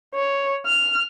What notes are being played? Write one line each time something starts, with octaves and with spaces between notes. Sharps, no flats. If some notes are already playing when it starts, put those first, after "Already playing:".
C#5
F6